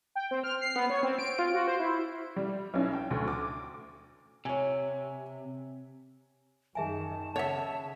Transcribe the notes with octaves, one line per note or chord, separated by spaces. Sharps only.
G5
C4
F6
C7
B3
C#5
C4
D7
F4
F#4
C5
E4
G3
B1 C#4 E4
G5
D2
D6
C3 C#5 G#5
F#2 D#3 G#4 E5 G#5 A5
C#3 C#5 D#5 E5 F#5